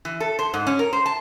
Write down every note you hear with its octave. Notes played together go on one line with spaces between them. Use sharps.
E3
A4
C5
G#2
C#4
A#4
C5
A5